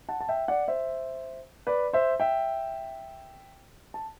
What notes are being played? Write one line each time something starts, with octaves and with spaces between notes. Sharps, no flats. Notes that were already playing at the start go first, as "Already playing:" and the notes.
F#5 A5
A5
E5 G5
D5 F#5
C5 E5
B4 D5
C5 E5
E5 G5
A5